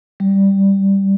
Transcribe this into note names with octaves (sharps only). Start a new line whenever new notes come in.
G3